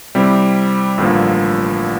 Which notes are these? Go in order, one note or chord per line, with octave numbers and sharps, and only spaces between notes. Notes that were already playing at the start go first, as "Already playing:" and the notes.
C3 G3 C4 E4 G4
A1 G2 D3 F3 A#3